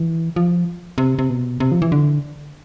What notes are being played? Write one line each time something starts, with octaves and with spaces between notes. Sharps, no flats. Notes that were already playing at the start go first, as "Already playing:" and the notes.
Already playing: E3
F3
C3
C3
B2
C3
F3
E3
D3